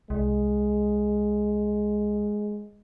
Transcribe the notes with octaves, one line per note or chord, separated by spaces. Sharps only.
C2 G#3